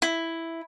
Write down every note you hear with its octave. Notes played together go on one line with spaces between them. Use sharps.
E4